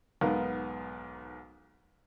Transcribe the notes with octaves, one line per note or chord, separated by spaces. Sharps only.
B1 G#2 B3 A#4 F5